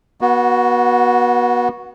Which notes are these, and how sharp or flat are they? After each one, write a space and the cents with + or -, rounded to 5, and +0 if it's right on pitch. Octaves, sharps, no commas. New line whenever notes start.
B3 -35 F#4 +0